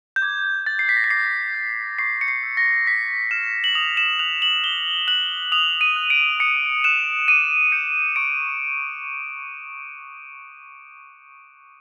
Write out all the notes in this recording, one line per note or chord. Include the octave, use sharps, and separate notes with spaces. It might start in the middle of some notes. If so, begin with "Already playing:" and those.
G6
D6 G#6
F#6 A6
C7
B6
A#6
B6
D6 C7
G6
C#6 C7
C#7
C7
E6 G6
A#6
C#6 B6
F6 E7
F#7
D#6 F7
E7
F#6 F7
F#7
D6 G7
F#6 F#7
D#6 F7
D#7
F#6
D7
D#6 C#7
F#6 E7
D6 D#7
G6 C#7
C#6 D7